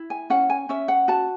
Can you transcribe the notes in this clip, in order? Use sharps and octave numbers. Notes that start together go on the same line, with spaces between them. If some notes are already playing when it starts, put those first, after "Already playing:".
Already playing: E4
G#5
C#4 F#5
G#5
C#4 E5
F#5
F#4 A5